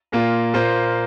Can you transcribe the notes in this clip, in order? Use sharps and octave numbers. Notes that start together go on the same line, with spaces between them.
A#2 A#3 F4
A#2 A#3 F4 C5